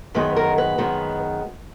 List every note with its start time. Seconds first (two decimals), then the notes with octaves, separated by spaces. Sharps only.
0.15 F#2 D#3 G#3 B3 B4
0.36 A#4
0.58 B4
0.78 F#2 D#3 G#3 B3